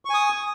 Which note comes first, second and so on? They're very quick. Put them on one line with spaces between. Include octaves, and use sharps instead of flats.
C#6 G#5 D#6